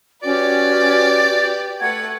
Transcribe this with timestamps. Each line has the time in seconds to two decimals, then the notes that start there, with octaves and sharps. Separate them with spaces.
0.23 C#4 F#4 G4 B4 D5
1.80 A3 B4 F#5 G#6